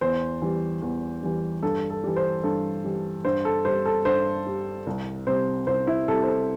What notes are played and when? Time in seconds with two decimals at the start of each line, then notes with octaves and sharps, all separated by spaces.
0.01 E2 C5
0.42 E3 G3
0.82 E2
1.23 E3 G3
1.63 G2 A4
1.90 A4
2.04 E3 G3
2.16 C5
2.43 G2 A4
2.84 E3 G3
3.25 G2 C5
3.45 A4
3.65 G3 C5
3.85 A4
4.05 G2 C5
4.47 G3
4.87 C2
5.27 C3 G3 C5
5.67 C2 C5
5.87 E4
6.08 C3 G3 A4
6.23 C5
6.28 A4